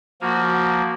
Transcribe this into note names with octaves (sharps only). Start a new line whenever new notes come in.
F3 A#3 F#4